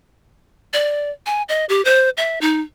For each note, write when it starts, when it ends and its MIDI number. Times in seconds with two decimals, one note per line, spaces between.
0.73 1.11 74
1.26 1.42 80
1.49 1.65 75
1.69 1.83 67
1.85 2.10 72
2.17 2.39 76
2.41 2.61 63